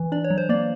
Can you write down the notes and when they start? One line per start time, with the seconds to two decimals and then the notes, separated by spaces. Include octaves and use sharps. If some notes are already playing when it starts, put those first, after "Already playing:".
Already playing: E3
0.12 D4 D5
0.24 C#5
0.30 F#3
0.38 C5
0.49 A#3 D5